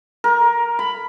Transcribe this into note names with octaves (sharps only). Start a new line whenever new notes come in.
A#4
B5